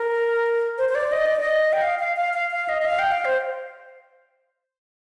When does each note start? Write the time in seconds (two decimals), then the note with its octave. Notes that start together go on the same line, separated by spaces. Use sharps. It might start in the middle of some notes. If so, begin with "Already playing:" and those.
Already playing: A#4
0.78 C5
0.89 C5
0.95 D5
1.12 D#5
1.26 D5
1.40 D#5
1.73 G5
1.82 F5
1.99 F5
2.17 F5
2.34 F5
2.51 F5
2.69 D#5
2.82 D#5
2.86 F5
2.99 G5
3.12 F5
3.25 C5